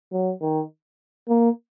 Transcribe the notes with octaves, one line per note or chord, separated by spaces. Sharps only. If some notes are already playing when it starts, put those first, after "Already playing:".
F#3
D#3
A#3